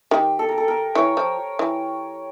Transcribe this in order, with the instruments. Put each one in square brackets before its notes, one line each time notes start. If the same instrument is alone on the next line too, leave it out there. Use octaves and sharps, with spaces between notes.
[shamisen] D#3 [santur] G4
[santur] A4
A#4
A4
A#4
[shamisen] E3 [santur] C#5
[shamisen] F3
E3